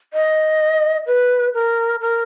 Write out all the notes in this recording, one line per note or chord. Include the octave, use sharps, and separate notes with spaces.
D#5
B4
A#4
A#4